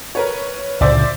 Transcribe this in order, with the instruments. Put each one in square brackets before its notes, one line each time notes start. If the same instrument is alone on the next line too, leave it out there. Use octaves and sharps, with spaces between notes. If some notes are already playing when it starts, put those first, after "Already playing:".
[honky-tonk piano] A#4 B4 C#5
[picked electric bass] C#2 A#2 D3 [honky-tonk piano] C5 D5 E5